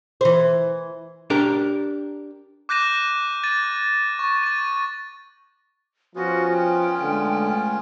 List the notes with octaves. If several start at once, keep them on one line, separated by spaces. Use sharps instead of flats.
E3 C5
D4 G4 A#4
D6 F#6 G6 A#6 D#7 E7
A6 D#7
C#6
A6 D#7
F3 B3 C#4 F4 F#4
G5
D3 G#3 A3